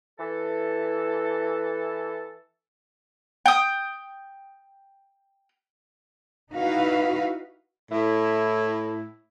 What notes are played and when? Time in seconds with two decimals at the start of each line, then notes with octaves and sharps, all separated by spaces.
0.19 E3 A4
3.46 G5 D#6
6.52 D#4 E4 F#4 B4 F5
7.92 A2 E4